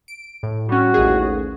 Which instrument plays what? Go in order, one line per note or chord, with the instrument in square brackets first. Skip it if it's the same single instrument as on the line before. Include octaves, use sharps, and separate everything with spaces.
[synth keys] D7
A2
[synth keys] G3 C#4 [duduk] F#4
[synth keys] A1 D#2 G#4